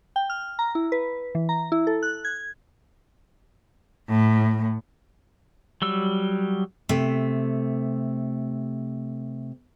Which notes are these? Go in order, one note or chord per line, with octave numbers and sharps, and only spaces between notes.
G5
F6
A#5
E4
B4
E3
A#5
E4
A4
F#6
G#6
A2
F#3 G3 E6
C3 A3